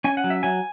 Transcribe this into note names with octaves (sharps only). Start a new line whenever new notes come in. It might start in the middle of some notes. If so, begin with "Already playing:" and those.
C#4 G#5
F#5
F#3
E5
F#3 G#5